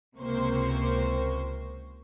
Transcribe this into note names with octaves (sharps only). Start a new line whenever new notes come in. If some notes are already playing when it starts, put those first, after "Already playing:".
C#2 C3 A#3 C5 C#6